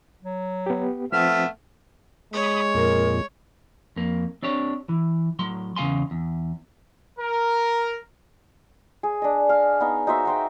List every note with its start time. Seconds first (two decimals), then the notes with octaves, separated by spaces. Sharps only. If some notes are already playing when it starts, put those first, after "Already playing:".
0.22 F#3
0.66 B3 G4
1.12 F3 A3 B3 C4 E5 F6
2.33 G#3 C#5 B5 D#6
2.75 F2 A#2 A#4
3.96 F2 A#3
4.43 C4 D4 G4 C#5
4.89 E3
5.39 A2 F#3 C6
5.76 E2 C#3 D4 F5 G#5 C6
6.11 E2
7.19 A#4
9.03 G#4
9.22 D4 D#5
9.49 F5
9.80 B3 D#4
10.07 D#4 F#4 C5 E5
10.25 F#4 C5 G5